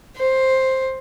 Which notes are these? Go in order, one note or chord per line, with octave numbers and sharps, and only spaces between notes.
C5